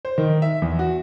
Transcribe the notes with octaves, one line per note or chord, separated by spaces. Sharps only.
C5
D#3
E5
E2
F#4